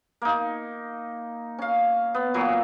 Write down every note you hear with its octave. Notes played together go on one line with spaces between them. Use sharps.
A#3 D#4
C#4 F5
B3
A#2 E3 F#3